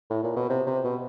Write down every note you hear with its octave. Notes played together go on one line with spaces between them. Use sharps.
A2
A#2
B2
C3
C3
B2